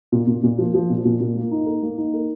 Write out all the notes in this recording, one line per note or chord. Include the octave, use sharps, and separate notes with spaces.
A#2
A#2
A#2
F3
F3
A#2
A#2
A#2
A#3
D#4
A#4
A#3
D#4
A#4